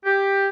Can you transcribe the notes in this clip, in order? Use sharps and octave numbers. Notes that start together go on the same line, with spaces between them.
G4